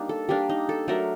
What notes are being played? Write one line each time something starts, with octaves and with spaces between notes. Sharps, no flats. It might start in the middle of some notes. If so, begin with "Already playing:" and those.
Already playing: G3 A#3 D4 D#4
A4
G3 A#3 D4 G4
D#4
A4
F#3 A3 D4 A#4